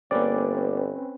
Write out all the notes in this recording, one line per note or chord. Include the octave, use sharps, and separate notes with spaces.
G1 A#3 C4 C#4 B4 D5